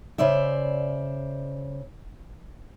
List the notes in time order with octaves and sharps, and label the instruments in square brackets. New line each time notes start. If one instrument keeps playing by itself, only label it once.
[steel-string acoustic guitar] C#3 C5 D5 E5